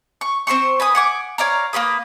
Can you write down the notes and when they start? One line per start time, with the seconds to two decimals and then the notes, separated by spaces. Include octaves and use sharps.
0.21 C#6
0.47 C4 C5 C6 C#6
0.80 B4 G#5 D#6
0.95 F#5 G#5 D6
1.38 C#5 D5 F5 A#5
1.73 A#3 A#4 B4 D#6